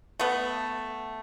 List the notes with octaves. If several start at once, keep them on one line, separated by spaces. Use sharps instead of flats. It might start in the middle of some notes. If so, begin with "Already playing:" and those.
A3 B3